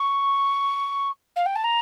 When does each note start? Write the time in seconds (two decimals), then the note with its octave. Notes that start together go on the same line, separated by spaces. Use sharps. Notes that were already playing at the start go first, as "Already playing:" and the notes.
Already playing: C#6
1.36 F5
1.46 G5
1.56 A5
1.64 A#5